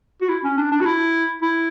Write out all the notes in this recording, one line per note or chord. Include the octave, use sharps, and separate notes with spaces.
F#4
E4
C#4
D4
D4
F#4
E4
E4